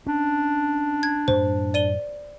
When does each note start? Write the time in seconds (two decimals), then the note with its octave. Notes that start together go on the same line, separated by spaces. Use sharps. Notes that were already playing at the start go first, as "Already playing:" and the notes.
0.06 C#4 D4
1.03 G#6
1.28 F#2 A2 C5
1.74 D5 D#7 G7